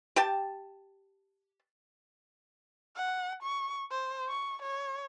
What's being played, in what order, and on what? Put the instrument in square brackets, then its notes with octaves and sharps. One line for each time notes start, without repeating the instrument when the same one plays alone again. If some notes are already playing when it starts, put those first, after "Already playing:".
[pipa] G4 G5 A5
[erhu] F#5
C#6
C5
C#6
C#5